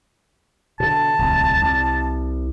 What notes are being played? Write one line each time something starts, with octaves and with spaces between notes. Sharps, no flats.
B2 D3 A5
D1 C2
C2